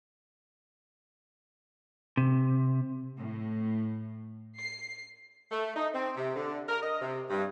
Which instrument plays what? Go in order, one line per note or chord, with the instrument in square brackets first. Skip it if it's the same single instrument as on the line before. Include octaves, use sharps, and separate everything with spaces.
[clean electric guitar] C3
[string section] A2
C7
[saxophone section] A3
D#4
C4
C3
D3
A#4
D#5
C3
G2